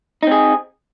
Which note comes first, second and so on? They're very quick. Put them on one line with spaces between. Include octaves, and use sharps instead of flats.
D#4 C4 G#4